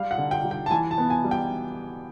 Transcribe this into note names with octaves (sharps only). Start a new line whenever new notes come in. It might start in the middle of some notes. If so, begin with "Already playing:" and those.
Already playing: G3 F5
F#5
D3
G5
G3
G5
A5
E3 G#5
A5
B3
G#5
G3
G5